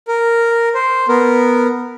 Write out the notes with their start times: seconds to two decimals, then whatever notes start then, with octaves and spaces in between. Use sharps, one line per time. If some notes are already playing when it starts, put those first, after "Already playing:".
0.08 A#4
0.74 C5
1.09 B3 A#4